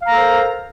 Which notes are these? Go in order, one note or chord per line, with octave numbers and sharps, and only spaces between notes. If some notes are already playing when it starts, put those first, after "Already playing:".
A4 A#4 C5 F5 A#5